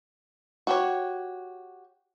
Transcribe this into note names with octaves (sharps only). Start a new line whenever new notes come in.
F#4 G4 C#5